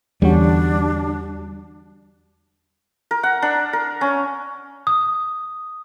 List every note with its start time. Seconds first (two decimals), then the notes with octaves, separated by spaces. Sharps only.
0.22 E2 D3 G3 C#4 D4 F#4
3.11 A#4
3.23 F#5
3.42 D4
3.73 A#4
4.01 C#4
4.87 D#6